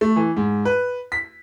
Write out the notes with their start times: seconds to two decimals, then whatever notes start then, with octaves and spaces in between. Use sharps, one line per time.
0.01 A3
0.16 E3
0.37 G#2
0.65 B4
1.12 B6